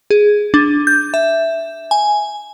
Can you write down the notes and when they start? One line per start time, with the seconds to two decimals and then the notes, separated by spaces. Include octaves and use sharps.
0.10 G#4
0.54 D4
0.87 G6
1.14 E5
1.91 G#5